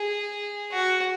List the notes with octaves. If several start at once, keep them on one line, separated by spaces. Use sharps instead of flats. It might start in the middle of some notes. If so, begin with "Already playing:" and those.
Already playing: G#4
F#4